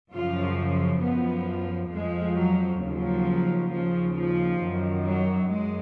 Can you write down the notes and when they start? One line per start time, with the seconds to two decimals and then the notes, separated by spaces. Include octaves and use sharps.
0.12 F#2 C#3 F3 F4
1.01 F#2 F3 B3
1.91 F2 F3 G#3
2.37 F#3
2.80 D#2 C#3 F3 F#3
3.70 D#2 C#3 F3
4.15 F3
4.61 F#2 D#3
5.04 F#3
5.49 F#2 G#3